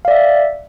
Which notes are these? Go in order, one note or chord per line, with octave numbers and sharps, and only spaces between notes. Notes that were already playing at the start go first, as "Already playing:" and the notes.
D5 E5 F5